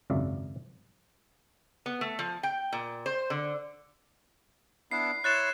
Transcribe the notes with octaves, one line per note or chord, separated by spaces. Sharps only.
G#1 C#2 F#2 D5 E5 F5
B3
A3
F3
G5
A#2
C5
D3
B3 D4 E4 C7
E4 C#5 C6 F#6 A6 E7